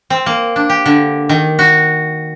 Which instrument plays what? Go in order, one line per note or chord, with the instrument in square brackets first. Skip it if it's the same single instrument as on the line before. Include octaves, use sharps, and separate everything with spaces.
[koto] C4
A#3
D4
G4
D3
D#3
F#4